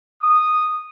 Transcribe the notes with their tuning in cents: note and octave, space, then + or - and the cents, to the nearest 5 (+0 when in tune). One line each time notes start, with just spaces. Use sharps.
D#6 -10